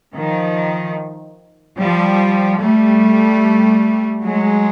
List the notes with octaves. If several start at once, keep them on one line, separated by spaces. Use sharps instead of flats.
D#3 F3
F3 G3
G3 A3
F#3 G#3